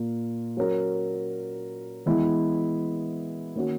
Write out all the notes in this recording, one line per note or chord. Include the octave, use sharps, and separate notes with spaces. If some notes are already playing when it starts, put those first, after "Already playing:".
Already playing: A#2 A#3
F#3 C#4 F#4 A#4
E3 G#3 B3 E4
D#3 A#3 C#4 F#4 C#5